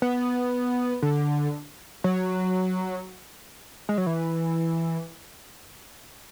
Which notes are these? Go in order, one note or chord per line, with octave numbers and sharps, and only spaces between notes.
B3
D3
F#3
G#3
F#3
E3